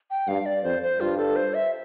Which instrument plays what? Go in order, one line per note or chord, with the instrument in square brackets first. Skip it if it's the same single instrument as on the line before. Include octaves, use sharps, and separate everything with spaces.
[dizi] G5
[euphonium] G2 [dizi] F5
[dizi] D5
[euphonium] F2 [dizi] C5
[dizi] C5
[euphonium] G2 [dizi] F4
[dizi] A4
C5
E5